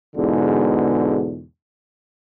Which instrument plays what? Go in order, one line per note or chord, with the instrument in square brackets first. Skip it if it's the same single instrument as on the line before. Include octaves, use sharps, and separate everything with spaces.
[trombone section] E2 G#2 B2 D3